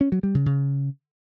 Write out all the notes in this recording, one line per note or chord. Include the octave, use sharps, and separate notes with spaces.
C#4
F#3
G3
C#3
C#3